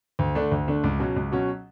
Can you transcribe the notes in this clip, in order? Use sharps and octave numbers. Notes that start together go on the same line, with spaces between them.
D2
D3 A3 D4
D2
D3 A3 D4
C#2
B2 F#3 C#4 F#4
C#2
B2 F#3 C#4 F#4